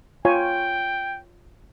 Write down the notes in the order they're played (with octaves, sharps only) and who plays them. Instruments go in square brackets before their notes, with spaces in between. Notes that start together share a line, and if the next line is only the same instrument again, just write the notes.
[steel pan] F4 C#5 G#5 [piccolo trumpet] G5